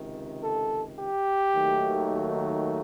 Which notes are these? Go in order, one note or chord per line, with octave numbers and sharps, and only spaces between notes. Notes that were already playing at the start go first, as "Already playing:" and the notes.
Already playing: C#2 C3 D#3
A4
G4
D#2 D#3 F#3 A3